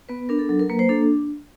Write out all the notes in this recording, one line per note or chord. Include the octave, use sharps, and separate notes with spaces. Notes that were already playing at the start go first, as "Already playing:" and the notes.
B3 B4
D4 A#4
A4
F#3 A4
A#4
A#3 B4
C5
D4 A4